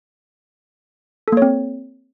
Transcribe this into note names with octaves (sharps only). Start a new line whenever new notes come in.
A#3 C4 A4 C#5